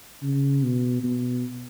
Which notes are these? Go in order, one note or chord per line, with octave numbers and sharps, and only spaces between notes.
C#3
B2
B2